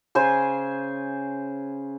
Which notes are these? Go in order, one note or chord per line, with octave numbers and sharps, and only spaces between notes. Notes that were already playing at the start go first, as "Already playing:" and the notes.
C#3 C5 G#5 C6